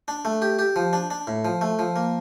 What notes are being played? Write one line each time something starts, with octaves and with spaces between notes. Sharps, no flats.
D4
A3
G4
G4
F3
D4
D4
A2
F3
A3
F3
A#3